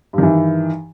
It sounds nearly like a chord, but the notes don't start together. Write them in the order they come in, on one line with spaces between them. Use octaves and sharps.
G2 D#3 E3